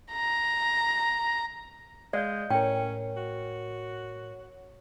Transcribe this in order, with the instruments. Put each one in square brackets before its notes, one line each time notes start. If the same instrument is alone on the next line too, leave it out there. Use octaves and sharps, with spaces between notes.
[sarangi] A#5
[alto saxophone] G#3 [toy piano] D5 [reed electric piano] D#5 F5 G6
[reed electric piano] A2 A#4 [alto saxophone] C#4 [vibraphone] C#5 [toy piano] G5
[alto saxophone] F#4